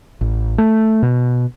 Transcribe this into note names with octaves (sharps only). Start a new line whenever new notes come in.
A1
A3
B2